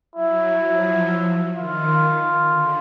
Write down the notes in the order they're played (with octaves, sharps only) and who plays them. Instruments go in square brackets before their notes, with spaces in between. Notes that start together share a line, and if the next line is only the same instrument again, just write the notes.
[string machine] F#3 [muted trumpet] E4
[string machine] F3
[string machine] D#3 [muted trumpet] F4
[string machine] D3